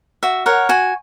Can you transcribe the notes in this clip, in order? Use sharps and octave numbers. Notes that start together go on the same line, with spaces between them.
F#4 E5
A#4 C#5 F#5
F#4 G#5